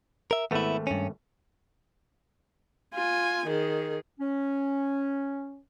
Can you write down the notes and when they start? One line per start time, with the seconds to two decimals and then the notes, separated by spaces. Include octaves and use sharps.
0.31 A#4 E5
0.51 G#1 A3 B3 E4
0.87 G2 C#4
2.94 F4 G#5
3.46 D#3 G#4
4.20 C#4